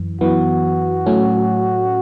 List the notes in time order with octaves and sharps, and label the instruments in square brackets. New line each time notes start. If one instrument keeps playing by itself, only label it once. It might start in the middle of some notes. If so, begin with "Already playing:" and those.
Already playing: [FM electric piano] F#2 E3
[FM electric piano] F#2 E3 B3 [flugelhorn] F#4
[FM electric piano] A2 F#3 A3 C#4